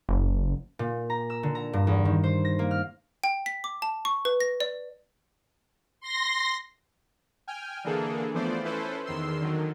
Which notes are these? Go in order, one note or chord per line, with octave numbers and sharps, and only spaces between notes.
F#1
A#2
A#5
E6
D3
A#5
G2
E2
D#3
C5
A#6
A#3
F6
G5
B6
D6
A5
C#6
B4
A#6
D5
C6 A#6
G5 G#5 F6
D3 E3 A#3 D4 G#4 A4
E3 F3 A3 B3 C5 D5
C#4 E4 A4 B4 C5
E2 D#3 C6 E6
D3 D#3 F#3